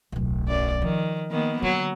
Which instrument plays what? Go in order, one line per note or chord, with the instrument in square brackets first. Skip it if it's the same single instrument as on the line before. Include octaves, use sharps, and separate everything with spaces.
[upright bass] D1 B1
[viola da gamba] F#2 D5
[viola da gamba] D#3 [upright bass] F3
[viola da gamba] D#3 A#3 B3
[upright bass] D3 [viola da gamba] F#3